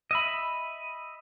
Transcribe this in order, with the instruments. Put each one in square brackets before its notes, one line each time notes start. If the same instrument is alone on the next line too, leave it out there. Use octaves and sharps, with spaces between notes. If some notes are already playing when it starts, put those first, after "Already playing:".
[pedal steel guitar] D#5 E5 B5